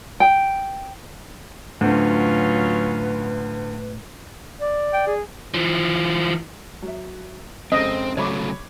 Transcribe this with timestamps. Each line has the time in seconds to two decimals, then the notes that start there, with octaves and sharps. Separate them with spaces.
0.20 G5
1.81 D2 A2 D3 F#3 C#4 F4 B4
4.61 D5
4.93 G5
5.07 G#4
5.54 E3 F3
6.82 F#3 E5
7.72 F1 C#3 G#3 C4 D#5
8.17 C#3 F#3 A3 C#5 B5 D6